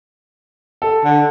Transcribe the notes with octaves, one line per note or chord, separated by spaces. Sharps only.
A4
D3